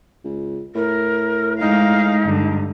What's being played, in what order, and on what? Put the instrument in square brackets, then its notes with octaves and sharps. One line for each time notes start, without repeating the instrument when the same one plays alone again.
[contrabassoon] C#2
[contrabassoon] A2 [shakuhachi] A#4
[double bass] G#3 [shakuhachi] D#4 [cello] A#4 F5
[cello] G2 D3